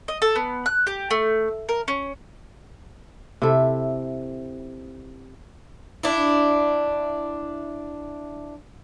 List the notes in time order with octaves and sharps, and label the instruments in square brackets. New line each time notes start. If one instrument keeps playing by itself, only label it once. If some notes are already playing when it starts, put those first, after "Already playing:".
[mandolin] D#5
A4
B3
F#6
G4
A3
A#4
C#4
[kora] C3 E4 A4
[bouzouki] D4 E4